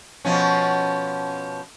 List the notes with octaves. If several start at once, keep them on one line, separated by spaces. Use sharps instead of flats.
B2 F3 C#4